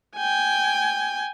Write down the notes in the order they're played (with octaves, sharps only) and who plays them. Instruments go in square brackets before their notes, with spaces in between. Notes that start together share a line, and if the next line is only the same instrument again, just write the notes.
[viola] G5 G#5